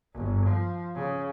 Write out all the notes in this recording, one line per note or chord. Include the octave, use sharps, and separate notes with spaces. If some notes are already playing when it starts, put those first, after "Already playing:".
G1
F3
C#3